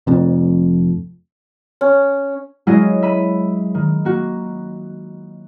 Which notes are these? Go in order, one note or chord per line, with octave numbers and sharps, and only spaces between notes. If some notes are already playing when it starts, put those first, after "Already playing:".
F1 F2
C#4
F#3 G#3 C#4 E4 D#5 F5
E5 B5 D#7
D#3
A#3 F#4